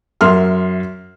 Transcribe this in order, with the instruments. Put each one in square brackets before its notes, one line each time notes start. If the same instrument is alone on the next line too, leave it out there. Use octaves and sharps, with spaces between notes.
[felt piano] F#2 E5 C6 F6